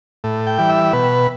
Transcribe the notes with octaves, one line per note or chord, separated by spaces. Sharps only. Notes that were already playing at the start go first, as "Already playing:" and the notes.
A2
G5
E3 G3
E5
B2 B4